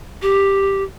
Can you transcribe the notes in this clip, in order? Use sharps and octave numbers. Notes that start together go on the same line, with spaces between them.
G4